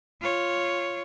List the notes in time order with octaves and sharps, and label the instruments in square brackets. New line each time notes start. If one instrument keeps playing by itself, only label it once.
[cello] F4 C#5